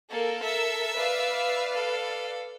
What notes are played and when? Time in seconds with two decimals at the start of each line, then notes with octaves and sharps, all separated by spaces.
0.11 A#3 A4 A#4
0.43 E5 E6
0.97 B4 D5 F5
1.74 A4